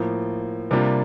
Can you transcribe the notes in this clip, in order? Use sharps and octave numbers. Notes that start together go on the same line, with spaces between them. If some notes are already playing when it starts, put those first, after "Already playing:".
Already playing: A2 F3 A#3
C3 G3 A#3 D4 F4